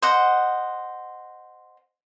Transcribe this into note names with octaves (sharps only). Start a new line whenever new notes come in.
C5 D#5 F#5